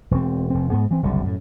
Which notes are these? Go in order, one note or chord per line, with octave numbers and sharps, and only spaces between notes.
E1 C4
F1 C4
G#2 B3
E3 C4
F#1 C2 D3
F#2 A2